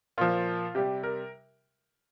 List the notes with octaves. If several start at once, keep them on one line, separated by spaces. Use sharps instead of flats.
A#2 F3 F4
C3 G3 G4
A#4